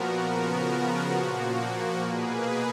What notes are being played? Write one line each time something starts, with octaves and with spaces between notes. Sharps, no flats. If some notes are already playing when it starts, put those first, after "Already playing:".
Already playing: A#2 F3 B3 F#4 A#4
C#3 F3 B3
A#2 F3 A#3 F#4
B2 A#3 G#4 B4